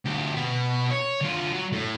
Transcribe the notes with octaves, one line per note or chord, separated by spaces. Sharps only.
D2 G4
B2 B3
C#5
D3 F4
F#3
A2